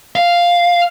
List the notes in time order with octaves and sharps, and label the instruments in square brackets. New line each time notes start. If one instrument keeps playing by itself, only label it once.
[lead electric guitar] F5